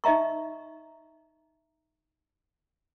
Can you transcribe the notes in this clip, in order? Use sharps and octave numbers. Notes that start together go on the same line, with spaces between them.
D#4 D#5 E5 A#5 C#6